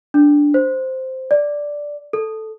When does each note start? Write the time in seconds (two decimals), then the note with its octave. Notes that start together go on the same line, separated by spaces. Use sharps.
0.14 D4
0.54 C5
1.31 D5
2.13 A4